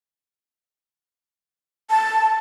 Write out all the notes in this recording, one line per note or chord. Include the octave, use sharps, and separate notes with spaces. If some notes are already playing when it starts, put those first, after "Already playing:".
A5